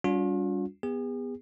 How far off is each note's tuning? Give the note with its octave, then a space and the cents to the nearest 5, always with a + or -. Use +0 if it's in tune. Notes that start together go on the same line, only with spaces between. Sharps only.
G3 +0 D4 -45 F4 +45
B3 +0 G#4 -40